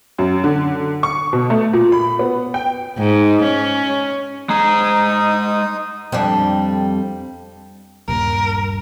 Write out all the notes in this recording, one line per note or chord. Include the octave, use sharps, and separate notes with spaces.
F#2
D3
C#6
B2
A3
A#2
B5
B3
G5
G#2
C#4
G#3 D#4 A#5 D#6
F2 G3 D4
D#1 G2 A#4